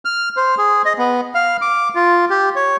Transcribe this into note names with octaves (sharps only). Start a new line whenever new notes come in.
F6
C5
G#4
D#5
B3
F5
D6
F4
G4
C#5